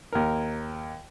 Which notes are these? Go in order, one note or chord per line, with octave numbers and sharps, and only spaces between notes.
D#2 A#4